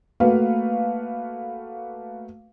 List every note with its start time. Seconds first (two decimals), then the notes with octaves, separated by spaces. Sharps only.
0.20 A3 A#3 F#4 B4 F5